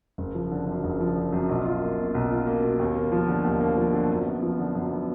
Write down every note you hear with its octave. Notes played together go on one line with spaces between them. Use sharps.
F#1
F3
D3
F#2
F#1
F3
D3
F#2
B1
F4
A#3
B2
B1
F4
A#3
B2
D#2
A#3
F3
D3
D#2
A#3
F3
D3
F#2
B3
F3
D3
F#2
B3